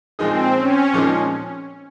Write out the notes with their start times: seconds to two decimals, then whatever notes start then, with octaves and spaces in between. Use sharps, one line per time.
0.19 A#2 F3 G#3 C4 D#4 G#4
0.57 C#4
0.93 A#2 F3 G#3 D#4 G#4